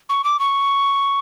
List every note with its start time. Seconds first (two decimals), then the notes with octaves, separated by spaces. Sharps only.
0.09 C#6
0.24 D6
0.40 C#6